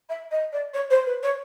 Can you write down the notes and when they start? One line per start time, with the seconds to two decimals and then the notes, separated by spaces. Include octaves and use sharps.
0.09 E5
0.31 D#5
0.52 D5
0.74 C#5
0.90 C5
1.06 B4
1.23 C#5